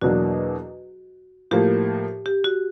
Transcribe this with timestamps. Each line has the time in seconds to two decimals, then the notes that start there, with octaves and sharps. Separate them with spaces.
0.01 E2 B2 F#3 A#3 D4 F#4
1.51 A2 F3 A#3 G4
2.26 G4
2.44 F#4